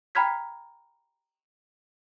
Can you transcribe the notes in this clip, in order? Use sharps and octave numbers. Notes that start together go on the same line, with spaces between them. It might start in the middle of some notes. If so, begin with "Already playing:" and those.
G5 A#5 B5 F6 G#6 B6